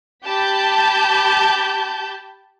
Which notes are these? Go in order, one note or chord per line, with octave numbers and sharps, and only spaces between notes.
G4 A5 B5 G6